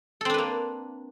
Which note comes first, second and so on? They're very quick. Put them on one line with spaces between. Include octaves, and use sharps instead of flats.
A4 C4 D4 B4 A#3